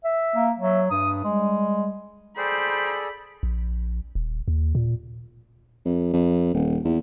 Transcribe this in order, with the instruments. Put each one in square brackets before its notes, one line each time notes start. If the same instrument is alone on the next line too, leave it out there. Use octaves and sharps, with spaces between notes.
[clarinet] E5
[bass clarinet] A#3
[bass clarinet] F#3 [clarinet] E5
[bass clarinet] G2 [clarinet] D#6
[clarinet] G3 [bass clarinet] G#3
[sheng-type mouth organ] G#4 A4 D5 [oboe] C5 [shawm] G5 [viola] B5
[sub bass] A#1
D#1
D#2
A#2
[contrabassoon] F2
F2
D#1
E2